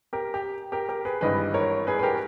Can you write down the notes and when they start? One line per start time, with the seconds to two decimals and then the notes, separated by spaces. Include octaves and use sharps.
0.13 G4 A#4
0.34 G4
0.72 G4 A#4
0.89 G4 A#4
1.05 G#4 B4
1.21 G#1 G2 E3 G3 B4 D#5
1.54 A#4 C#5
1.87 G#4 B4
1.99 B4
2.03 G4 A#4